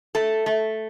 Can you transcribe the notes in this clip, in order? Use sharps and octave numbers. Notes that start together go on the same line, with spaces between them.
A3 A4
A3